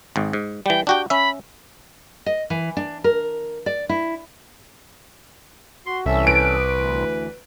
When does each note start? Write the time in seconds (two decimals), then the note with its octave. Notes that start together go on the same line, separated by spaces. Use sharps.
0.16 G#1 G#2
0.33 G#2
0.66 E3 G3 G5
0.87 D4 F#4 G4 G5
1.10 C#4 E5 B5
2.26 D#5
2.50 E3
2.77 D4
3.04 A#4
3.66 D5
3.89 E4
5.87 F#4 C6
6.06 C2 E3 C#4 A4 E5
6.27 B4 D7
6.76 D2 E3